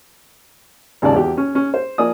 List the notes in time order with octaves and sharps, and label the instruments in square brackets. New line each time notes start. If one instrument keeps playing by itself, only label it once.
[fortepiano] G#1 D#2 C#3 D5 A5
E2 F#4 G4
C#4
C#4
C5
F3 A#3 D5 G#5 D#6